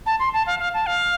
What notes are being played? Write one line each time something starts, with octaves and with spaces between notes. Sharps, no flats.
A5
C6
A5
F5
F5
A5
F5